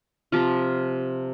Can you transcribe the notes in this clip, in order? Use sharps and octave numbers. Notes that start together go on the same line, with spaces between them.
C3 F3 F4